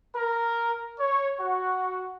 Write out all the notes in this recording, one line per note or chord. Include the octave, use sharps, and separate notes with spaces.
A#4
C#5
F#4